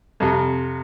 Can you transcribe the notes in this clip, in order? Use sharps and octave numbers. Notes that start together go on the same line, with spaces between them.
F2 C3